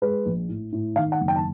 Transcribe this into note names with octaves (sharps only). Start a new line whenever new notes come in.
G#3 B4
A#1
A2
A2
D#3 F5
F#5
F#1
G5
A5